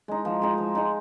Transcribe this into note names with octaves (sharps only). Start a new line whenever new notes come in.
G#3 D#4
F3
G#3 D#4
F3
G#3 D#4